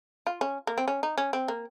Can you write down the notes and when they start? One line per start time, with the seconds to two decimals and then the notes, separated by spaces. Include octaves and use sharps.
0.27 F4
0.41 C#4
0.67 A#3
0.78 C4
0.88 C#4
1.03 D#4
1.18 C#4
1.33 C4
1.48 A#3